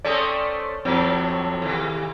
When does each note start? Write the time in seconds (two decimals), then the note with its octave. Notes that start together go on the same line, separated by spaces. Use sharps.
0.05 A3 C4 C#4 D5 D#6
0.85 F2 A2 F#3 C4
1.62 D#2 C3 E3